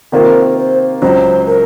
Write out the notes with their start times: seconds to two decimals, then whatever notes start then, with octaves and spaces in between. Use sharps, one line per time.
0.12 C3 D#3 A#3 F4 A#4 C5
0.57 C5
1.02 C#2 C#3 F#3 C5
1.47 A#4